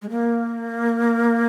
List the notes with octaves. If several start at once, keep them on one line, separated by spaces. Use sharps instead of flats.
G#3
A#3